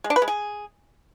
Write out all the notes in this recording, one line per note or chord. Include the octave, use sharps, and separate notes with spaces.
G#3
D4
B4
G#3
G#4